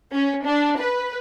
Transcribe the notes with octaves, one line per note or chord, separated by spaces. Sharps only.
C#4
D4
B4